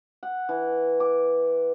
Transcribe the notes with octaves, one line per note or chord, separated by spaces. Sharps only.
F#5
E3
D6